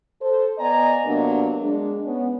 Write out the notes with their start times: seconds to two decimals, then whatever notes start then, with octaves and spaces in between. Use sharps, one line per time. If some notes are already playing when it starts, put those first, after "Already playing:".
0.22 A4 C5
0.58 B3 D5 D#5 G#5 A#5
1.05 C3 F#3 A#3 B3 D4
1.61 G#3 D4
2.05 B3 C#4